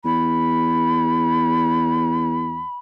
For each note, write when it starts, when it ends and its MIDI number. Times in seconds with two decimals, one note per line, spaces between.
0.05 2.64 40
0.05 2.76 83